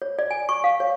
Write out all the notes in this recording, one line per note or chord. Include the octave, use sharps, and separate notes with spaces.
C#5
D5
G#5
C#6
F5
C#5